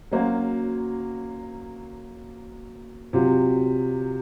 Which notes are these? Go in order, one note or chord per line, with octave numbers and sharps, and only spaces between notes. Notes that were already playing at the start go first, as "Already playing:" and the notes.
F#3 A#3 C#4 F#4 C5
C3 F#3 C4 F4